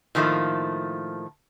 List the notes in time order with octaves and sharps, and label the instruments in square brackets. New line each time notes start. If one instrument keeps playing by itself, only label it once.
[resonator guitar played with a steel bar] A2 D#3 F3 A3 A#3